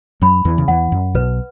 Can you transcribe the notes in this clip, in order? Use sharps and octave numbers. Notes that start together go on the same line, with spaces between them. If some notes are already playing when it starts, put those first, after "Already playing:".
F#2 F#3 B5
E2 E3
C#3
E2 E3 F#5
F#2
B1 B2 B4